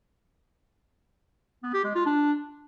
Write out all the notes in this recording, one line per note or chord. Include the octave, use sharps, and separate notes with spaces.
B3
G4
G#3
F4
D4